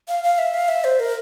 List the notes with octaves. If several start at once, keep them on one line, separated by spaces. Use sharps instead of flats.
F5
F5
E5
F5
E5
C5
A#4